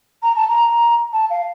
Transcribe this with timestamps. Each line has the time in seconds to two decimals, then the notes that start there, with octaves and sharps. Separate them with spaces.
0.23 A#5
0.36 A5
0.49 A#5
1.13 A5
1.30 F5